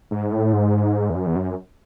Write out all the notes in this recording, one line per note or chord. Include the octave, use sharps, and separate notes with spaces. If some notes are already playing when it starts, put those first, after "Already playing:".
G#2
A2
G#2
E2
F#2
E2
F#2